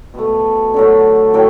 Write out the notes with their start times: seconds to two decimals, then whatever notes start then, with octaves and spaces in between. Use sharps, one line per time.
0.14 B2 A3
0.74 D3 F#3 A3
1.34 A2 F#3 A3 G5